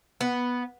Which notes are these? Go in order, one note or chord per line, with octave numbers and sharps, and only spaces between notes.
B3